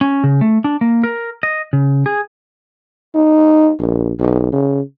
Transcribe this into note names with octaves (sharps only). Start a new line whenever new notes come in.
C#4
C#3
A3
D4
A#3
A#4
D#5
C#3
G#4
D#4
A#1
B1
C#3